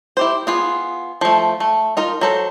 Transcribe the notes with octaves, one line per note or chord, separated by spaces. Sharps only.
E4 G4 C5
B3 F4 G#4
F3 A3
A3
D#4 F4 A#4
F#3 A4 C5